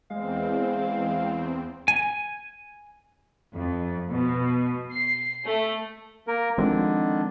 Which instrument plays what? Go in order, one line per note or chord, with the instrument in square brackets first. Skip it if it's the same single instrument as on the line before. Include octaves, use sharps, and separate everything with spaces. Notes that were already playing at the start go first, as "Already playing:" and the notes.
[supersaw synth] E2 C4 [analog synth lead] G#3 [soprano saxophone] F5
[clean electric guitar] G#5
[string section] F2
B2
C7
A3
[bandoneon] A#3 A#4
[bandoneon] D3 D#3 D4 [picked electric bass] F3 G#3 C4